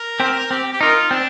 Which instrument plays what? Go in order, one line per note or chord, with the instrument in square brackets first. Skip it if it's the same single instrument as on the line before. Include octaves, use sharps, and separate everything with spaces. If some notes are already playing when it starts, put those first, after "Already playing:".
Already playing: [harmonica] A#4
[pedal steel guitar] C4 G4 C5
[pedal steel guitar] C4 [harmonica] G4
[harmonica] G4
[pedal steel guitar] D#4 A#4 [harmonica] F4
[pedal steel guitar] C4 [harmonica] D4